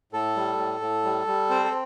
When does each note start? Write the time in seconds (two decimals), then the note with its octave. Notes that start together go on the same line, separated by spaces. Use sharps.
0.13 A2 A4
0.36 G3
0.58 A2
0.81 A2
1.05 G3
1.27 G3
1.50 C4 C5
1.64 A4